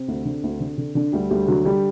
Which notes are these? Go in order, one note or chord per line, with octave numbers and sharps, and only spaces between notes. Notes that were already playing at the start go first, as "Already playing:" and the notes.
Already playing: C3 C4
D2
D3
D2
D3
D3
D3 D4
D2 G3 G4
D2 G3 G4
D3 F#3 F#4
D3 G3 G4